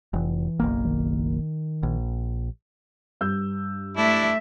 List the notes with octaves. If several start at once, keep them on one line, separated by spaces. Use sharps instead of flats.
F1 E3
F#1 B1 A#3
D#3
A#1
G2 E6 G6
A3 D4 E4 E5